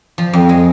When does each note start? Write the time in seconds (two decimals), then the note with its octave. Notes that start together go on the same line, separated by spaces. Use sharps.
0.18 F3
0.33 F2
0.49 G#3